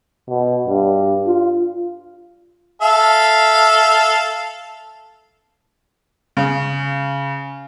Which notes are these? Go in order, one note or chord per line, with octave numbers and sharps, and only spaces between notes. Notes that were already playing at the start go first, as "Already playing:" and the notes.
B2
G2
F4
A4 E5 F5
C#3